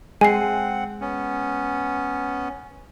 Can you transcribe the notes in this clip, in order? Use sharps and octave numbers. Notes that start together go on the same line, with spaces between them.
G#3 C4 F#5 G#5 C7
B3 C#4